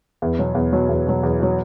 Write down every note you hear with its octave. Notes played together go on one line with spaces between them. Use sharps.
E2
B2 F#3
E2
B2 F#3
E2
B2 F#3
E2
B2 F#3